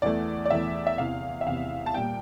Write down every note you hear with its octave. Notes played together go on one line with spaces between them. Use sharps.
E2 E3 A3 D5
D5
E2 E3 A3 E5
E5
E2 C3 E3 F5
E5
E2 C3 E3 F5
A5
A#2 G3 G5